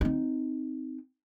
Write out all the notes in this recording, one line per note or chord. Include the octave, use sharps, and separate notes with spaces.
C4 D#4